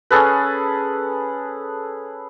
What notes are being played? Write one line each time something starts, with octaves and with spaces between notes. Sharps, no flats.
C#4 G#4 A4 B4